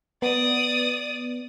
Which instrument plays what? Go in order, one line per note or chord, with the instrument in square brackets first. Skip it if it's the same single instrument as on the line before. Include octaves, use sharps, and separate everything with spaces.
[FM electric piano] B3 [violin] D5 D#6